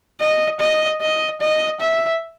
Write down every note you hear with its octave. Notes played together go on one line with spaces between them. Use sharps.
D#5
D#5
D#5
D#5
E5